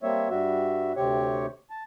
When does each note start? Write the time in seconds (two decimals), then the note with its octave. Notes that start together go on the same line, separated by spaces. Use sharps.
0.03 G3 A#3 C4 C#5 E5
0.30 G2 G3 F#4 E5
0.96 D2 C3 C4 G4 C#5 C#6
1.70 A5